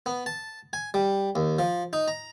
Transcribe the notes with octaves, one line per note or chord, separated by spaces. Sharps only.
B3
A5
G#5
G3
D#2
F3
D#4
A#5